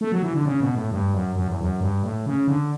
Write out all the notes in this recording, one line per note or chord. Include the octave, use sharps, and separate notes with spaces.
A3
F#3
E3
D3
C#3
B2
A2
G2
F#2
F#2
E2
F#2
G2
A2
C#3
D3